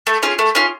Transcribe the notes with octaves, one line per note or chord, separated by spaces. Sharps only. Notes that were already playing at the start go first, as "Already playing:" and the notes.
A3
C#4 F4 G#4
A3
C#4 F4 G#4